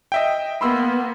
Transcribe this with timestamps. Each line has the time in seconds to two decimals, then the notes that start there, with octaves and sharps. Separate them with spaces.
0.12 D#5 E5 G5
0.61 A#3 B3 B5 C6 E6